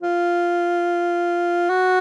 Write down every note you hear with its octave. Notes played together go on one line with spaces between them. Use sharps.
F4
F#4